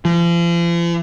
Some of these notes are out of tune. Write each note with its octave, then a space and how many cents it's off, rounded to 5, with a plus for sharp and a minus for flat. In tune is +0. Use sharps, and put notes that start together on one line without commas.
F3 -40